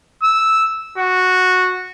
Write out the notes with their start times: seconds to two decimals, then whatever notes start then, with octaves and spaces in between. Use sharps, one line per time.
0.23 E6
0.98 F#4